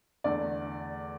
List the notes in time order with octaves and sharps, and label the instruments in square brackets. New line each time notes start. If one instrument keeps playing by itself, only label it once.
[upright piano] E2 D3 A3 D5